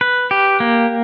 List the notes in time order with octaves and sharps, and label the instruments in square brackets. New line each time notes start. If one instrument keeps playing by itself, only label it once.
[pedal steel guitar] B4
G4
A#3